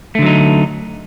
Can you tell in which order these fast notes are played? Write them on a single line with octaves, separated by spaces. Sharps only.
A3 D3 F#3 D#4